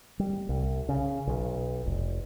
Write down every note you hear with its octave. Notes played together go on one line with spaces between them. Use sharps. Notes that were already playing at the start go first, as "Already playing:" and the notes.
G3
C2
C#3
B1
F1